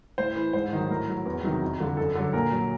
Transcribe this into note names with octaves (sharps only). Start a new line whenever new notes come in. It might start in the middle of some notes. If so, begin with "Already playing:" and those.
A2 C5
E3
G#2 C5
D#3 F#3
A2 A#4
F#3
E2
C3 D#3 F#3
F2
D3 F3
F#2 A4
D3 F#3
A#2 A#4
F#3